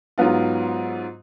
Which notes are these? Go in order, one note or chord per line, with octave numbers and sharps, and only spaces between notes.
G#2 F#3 B3 F4